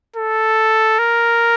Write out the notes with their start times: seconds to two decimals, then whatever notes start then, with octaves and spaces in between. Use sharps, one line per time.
0.16 A4
0.99 A#4